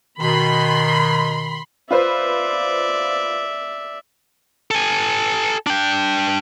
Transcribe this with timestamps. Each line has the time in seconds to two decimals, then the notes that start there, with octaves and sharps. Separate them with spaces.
0.19 B2 D#3 B5 C6
1.91 F4 B4 C5 D5 E5
4.71 A4 G#5
5.67 D4 G5